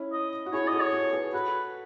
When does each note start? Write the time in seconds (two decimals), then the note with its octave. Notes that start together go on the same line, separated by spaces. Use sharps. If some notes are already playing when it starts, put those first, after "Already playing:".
Already playing: C#4 E4
0.13 D#5
0.46 F#4
0.53 E4 G#4 C#5
0.67 D#5
0.73 F#4 A4
0.80 C#5
0.93 F#4 A4
1.13 G#4 B4
1.33 F#4 A4 B4